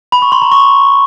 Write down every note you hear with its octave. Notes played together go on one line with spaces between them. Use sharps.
B5
C#6
C6
A#5
C#6